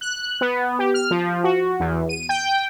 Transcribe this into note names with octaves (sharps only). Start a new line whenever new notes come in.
F#6
B3
G4
F6
F3
F#4
E2
D#7
G5